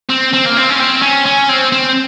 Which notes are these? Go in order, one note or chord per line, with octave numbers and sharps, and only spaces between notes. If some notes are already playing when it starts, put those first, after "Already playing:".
C4
C4
A#3
C4
C#4
C4
C#4
C#4
C4
C4